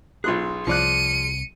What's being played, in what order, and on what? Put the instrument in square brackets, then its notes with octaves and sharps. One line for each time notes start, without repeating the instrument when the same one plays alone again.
[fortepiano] B1 C6 F#6 [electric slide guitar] F4 G#4
[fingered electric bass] C2 [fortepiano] F3 D5 F#6 [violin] C#7 D#7